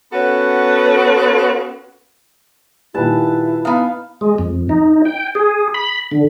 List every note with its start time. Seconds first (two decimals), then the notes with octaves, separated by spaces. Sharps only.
0.12 B3 C#4 F#4 A4 B4
2.94 A#2 D#3 G3 E4 B4 A5
3.65 B3 D#4 F5
4.21 G#3
4.38 F2
4.69 D#4
5.05 G5
5.35 G#4
5.74 B5
6.11 D3